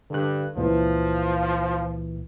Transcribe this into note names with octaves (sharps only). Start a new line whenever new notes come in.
G2 D3 F#6
C#2 A#2 E3 F3